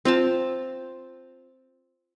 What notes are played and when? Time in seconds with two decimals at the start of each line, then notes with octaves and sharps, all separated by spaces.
0.05 C4 F4 G5 A5